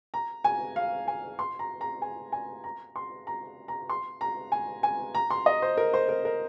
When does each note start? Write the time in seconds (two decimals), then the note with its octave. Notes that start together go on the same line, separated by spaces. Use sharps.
0.14 A#5
0.44 G#5
0.76 F5
1.08 G#5
1.39 C6
1.59 A#5
1.81 A#5
2.02 G#5
2.32 G#5
2.64 A#5
2.96 C6
3.27 A#5
3.68 A#5
3.89 C6
4.21 A#5
4.52 G#5
4.83 G#5
5.15 A#5
5.30 C6
5.46 D#5
5.62 C5
5.77 A#4
5.94 C5
6.09 A#4
6.25 A#4